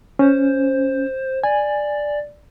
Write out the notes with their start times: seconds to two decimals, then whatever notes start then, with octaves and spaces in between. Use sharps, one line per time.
0.19 C#4 C5
1.44 D5 G#5